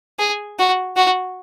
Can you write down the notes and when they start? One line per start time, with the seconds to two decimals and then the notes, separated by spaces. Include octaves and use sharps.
0.19 G#4
0.59 F#4
0.96 F#4